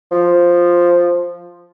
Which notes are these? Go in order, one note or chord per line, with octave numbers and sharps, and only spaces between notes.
F3